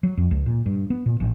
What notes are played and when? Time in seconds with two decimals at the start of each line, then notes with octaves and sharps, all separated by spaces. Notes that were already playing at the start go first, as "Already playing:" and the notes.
0.03 F#3
0.17 F2
0.31 C#2
0.46 A#2
0.66 G2
0.90 B3
1.06 A#2
1.20 A1